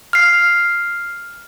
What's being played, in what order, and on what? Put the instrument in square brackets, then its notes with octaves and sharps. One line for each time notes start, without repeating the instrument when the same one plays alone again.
[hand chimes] F6 C7